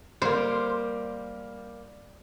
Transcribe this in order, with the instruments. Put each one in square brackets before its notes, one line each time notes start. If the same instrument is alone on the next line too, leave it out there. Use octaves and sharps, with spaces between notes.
[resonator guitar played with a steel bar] G3 A#3 [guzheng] C5